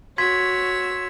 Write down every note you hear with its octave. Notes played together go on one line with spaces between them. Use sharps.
F#4 C#5 C6 E6 G#6 B6